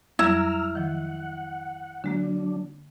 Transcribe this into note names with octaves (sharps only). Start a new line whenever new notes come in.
F2 F#3 G3 E4 A#5 E6 F6
D#3 F3 F#5
D3 F#3 G#3 A#3 D4